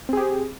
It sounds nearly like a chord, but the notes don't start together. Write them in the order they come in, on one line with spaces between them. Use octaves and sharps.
C4 G#4 G4